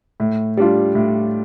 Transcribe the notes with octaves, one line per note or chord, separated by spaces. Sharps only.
A2
G3 D4 F4
A2